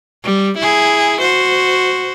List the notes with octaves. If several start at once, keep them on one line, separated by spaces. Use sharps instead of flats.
G3
E4 G#4
F#4 C5